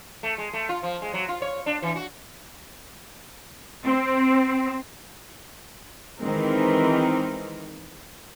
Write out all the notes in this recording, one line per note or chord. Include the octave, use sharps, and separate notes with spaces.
A3
G#3
A3
F4
F3
G#3
F#3
F4
C#5
D4
E3
F#4
C4
D#3 E3 G#3 C4 D#4 A#4